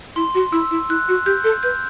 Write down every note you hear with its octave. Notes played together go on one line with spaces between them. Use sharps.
E4 C6
F#4
E4 E6
E4
E4 F#6
F#4
G4 G6
A4
B4 G6